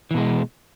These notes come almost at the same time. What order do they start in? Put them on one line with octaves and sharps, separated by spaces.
E3 B2 G#3